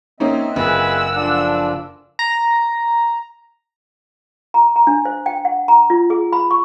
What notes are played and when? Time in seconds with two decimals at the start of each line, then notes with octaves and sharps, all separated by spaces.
0.20 A#3 C4 C#4 D#4 D#5 E5
0.56 F#1 F4 G#4 B4 F#5 E6
1.16 F3 D4 F4 A4
2.19 A#5
4.54 A#5
4.76 A#5
4.87 D4
5.05 C5
5.26 G5
5.45 F#5
5.68 A#5
5.90 F4
6.10 G#4
6.33 B5
6.51 C#6